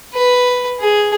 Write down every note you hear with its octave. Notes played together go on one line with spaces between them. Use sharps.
B4
G#4